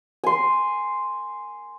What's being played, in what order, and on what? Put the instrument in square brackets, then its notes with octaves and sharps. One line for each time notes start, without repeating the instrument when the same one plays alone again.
[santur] G#5 C6